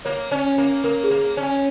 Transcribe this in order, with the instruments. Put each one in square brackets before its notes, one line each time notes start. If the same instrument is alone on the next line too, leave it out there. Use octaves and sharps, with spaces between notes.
[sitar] A#3 [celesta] C#5
[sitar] C#4
A#3
[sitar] A#3 [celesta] A#4
[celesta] G#4
[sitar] A#3
C#4
[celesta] G#5